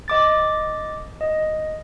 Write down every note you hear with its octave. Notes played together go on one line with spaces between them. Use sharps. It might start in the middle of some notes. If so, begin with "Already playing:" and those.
D#5 D6 A6
D#5